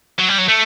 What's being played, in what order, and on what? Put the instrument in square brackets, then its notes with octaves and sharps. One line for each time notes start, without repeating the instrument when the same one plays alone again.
[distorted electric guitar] F#3
G3
F#3
A3